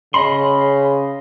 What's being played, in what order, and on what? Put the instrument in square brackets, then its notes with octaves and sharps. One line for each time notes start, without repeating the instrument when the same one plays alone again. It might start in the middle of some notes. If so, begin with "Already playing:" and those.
[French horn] C#3 [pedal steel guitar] D#5 B5 C6